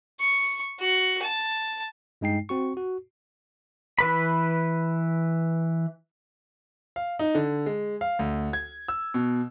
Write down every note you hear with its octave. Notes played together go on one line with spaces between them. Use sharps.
C#6
F#4
A5
G2 G#3 D#4 G5 C7
C4 F#4 C#6
F#4
E3 B4 B5
F5
D#4
D3
G#3
F5
D2
G#6
E6
B2